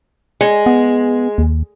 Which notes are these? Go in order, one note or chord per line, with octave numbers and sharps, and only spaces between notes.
G#3
B3
D#2